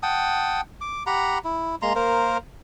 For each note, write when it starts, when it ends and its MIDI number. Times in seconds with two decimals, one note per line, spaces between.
0.03 0.61 78
0.03 0.61 79
0.03 0.61 81
0.03 0.61 87
0.81 1.03 86
1.07 1.38 67
1.07 1.38 78
1.07 1.38 82
1.07 1.38 83
1.44 1.75 64
1.82 1.93 56
1.82 1.93 58
1.82 1.93 82
1.82 1.93 84
1.95 2.37 58
1.95 2.37 70
1.95 2.37 72